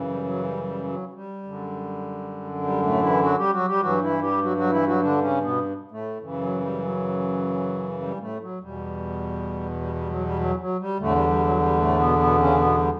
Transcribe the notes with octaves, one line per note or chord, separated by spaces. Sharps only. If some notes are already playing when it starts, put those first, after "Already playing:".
Already playing: F#2 C#3 E3
G3
F#3
G3
G3
F#3
F#3
G3
F#2 D3
G3
A2 A3
E3 E4
F#3 F#4
G3 G4
F#3 F#4
G3 G4
G2 E3 F#3 F#4
E3 E4
G3 G4
F#3 F#4
F#3 F#4
E3 E4
F#3 F#4
D3 D4
C#3 C#4
B2 B3
A2 A3
F#2 C#3 E3
F#3
G3
F#3
G3
A2 A3
F#3
E2 B2 G3
G3
G3
F#3
G3
F#3
F#3
G3
E2 A2 D3 A3
G3
G3
F#3
G3
A2 A3
B2 B3
B2 B3
C#3 C#4
B2 B3
G3